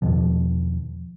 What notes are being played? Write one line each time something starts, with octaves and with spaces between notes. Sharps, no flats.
E2 B2 D#3 F3